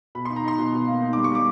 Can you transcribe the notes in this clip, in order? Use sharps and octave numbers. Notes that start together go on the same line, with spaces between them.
B2 B5
D#4 C6
A#5
D#4 C6
B2
B2
A#3
D#4
G3 D6
C#6
G3 D6